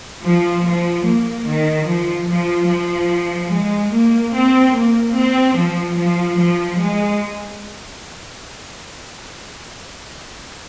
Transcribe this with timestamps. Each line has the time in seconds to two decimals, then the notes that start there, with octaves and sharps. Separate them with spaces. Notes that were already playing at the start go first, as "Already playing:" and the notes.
0.24 F3
0.65 F3
1.06 A#3
1.48 D#3
1.88 F3
2.29 F3
2.70 F3
3.52 G#3
3.94 A#3
4.34 C4
4.75 A#3
5.16 C4
5.57 F3
5.98 F3
6.39 F3
6.79 G#3